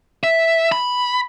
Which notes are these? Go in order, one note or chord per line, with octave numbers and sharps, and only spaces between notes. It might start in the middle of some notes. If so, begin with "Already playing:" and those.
E5
B5